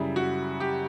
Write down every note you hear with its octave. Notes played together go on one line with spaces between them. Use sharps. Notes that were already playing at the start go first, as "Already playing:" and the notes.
Already playing: F#2 C#3 G3 E4
F#4
G4